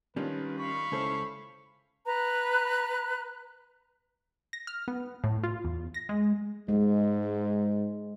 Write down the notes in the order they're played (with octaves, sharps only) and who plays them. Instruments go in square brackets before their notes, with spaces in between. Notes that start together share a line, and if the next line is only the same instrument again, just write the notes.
[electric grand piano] D#3 F4 [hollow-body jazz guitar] G3 C#4 D4 [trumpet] B4
[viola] F5 B5 [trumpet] C#6
[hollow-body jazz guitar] C#2 A4 [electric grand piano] C#4 E4 C5
[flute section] B4 A#5 F#6
[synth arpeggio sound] A#6
F6
B3
A2
F4
E2
A#6
G#3
[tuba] G#2 [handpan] G#3